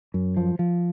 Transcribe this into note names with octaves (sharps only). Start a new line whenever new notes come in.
F#2
F3
F3